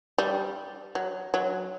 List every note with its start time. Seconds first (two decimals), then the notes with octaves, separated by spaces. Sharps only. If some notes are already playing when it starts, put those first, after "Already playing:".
0.18 G3
0.95 F#3
1.34 F#3